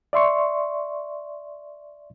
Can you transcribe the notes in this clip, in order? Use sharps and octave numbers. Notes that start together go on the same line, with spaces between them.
D5 E5 C6 C#6